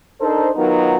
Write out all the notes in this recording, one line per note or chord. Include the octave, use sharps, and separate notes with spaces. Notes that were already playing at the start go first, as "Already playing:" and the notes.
D4 D#4 A4 A#4 C5
D#3 F#3 B3 D#4 F4 A#4